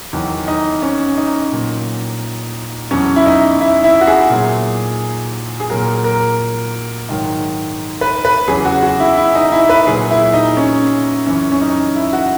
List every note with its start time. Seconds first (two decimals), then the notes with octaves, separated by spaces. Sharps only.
0.13 E2 D#3 F#3
0.48 D#4
0.82 C#4
1.17 D#4
1.52 A#2 F#3
2.91 E2 B2 F#3 C#4
3.16 E4
3.26 D#4
3.61 E4
3.84 E4
4.01 F#4
4.07 G#4
4.30 A#2 F#3
5.60 G#4
5.70 A#2 F#3 A#4
6.04 A#4
7.09 G#2 D#3 F#3
8.01 B4
8.25 B4
8.48 E2 C#3 F#3 G#4
8.65 F#4
8.83 F#4
9.00 E4
9.17 E4
9.35 D#4
9.52 E4
9.69 B4
9.87 A#2 F#3 G#4
10.11 E4
10.34 D#4
10.57 C#4
11.26 F#2 E3 C#4
11.52 C#4
11.61 D#4
11.96 E4
12.13 F#4